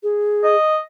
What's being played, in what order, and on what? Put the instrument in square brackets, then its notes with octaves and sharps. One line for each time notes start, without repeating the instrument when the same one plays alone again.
[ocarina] G#4
[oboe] D#5